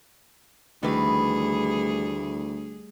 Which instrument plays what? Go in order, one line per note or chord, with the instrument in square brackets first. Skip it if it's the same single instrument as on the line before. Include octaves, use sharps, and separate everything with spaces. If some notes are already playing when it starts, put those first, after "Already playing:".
[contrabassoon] D2 [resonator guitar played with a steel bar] D#3 E3 B4 [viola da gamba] G3 A3 G#4